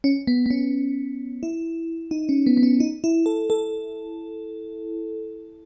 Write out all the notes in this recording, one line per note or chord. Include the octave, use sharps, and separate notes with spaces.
C#4
B3
B3
C#4
E4
D#4
C#4
B3
B3
C#4
D#4
E4
A4
A4